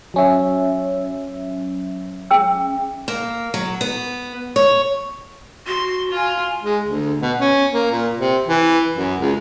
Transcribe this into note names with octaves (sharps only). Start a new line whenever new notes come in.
F#3 C#4 E5
G#4 G5 E6
A#3
F#3
B3
C#5
F#4 C6
F4 G#5
G#3
D2
B2
C#4
A#3
A#2
C3
E3
F#2
C#2